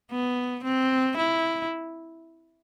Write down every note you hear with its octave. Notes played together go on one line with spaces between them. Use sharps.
B3
C4
E4